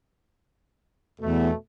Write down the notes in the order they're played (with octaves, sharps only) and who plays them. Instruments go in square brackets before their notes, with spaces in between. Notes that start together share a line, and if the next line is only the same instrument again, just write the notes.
[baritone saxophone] E2 [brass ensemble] B2 A3